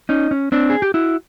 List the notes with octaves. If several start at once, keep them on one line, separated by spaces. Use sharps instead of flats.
C#4 D#4
C#4
C4 D4
G#4
G4
E4 F#4